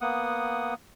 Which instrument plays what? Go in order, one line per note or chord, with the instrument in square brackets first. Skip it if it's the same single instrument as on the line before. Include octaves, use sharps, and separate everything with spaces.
[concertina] A#3 B3 F#5 D#6